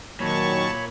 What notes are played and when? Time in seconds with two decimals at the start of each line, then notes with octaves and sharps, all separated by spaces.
0.20 A#2 D#3 F#3 C#5 A5 B5 C#6